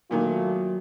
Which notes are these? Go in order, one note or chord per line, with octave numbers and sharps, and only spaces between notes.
A#2 D#3 F#3 A3 F4